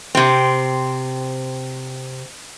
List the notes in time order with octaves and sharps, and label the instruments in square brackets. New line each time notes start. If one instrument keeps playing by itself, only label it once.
[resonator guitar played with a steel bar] C3 C4